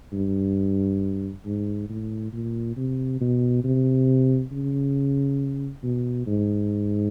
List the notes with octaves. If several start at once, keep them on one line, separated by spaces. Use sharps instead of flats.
G2
G#2
A2
A#2
C3
B2
C3
C#3
B2
G#2